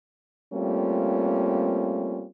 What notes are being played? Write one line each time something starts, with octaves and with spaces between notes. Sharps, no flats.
G3 A3 A#3 C4 C#4 F4